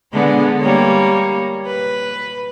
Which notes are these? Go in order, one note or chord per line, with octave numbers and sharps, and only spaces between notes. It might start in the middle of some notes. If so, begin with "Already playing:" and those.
D3 G#3 B3
G3 A#3 C#5
B4